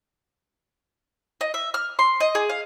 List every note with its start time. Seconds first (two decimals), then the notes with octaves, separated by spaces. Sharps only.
1.41 D#5
1.54 E5
1.74 F6
1.99 C6
2.20 D#5
2.35 G#4
2.49 F5